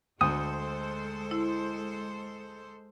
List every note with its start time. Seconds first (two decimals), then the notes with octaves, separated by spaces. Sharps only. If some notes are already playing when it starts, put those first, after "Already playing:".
0.21 D2 G#3 A4 C5 D#6
1.31 E4